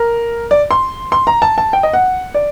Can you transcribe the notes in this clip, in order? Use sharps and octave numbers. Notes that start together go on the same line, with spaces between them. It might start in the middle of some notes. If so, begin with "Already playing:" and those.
Already playing: A#4
D5
C6
C6
A#5
A5
A5
G5
D#5
F#5
D5